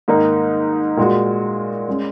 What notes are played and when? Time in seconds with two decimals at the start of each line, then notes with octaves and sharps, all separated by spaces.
0.08 G#2 D#3 A#3 D#4
0.97 A#2 G#3 F#4
1.88 G#3 C#4